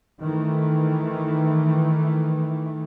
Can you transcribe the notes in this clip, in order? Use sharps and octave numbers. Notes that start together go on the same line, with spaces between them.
D#3 E3 A3